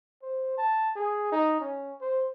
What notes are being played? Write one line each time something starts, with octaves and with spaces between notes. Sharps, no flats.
C5
A5
G#4
D#4
C#4
C5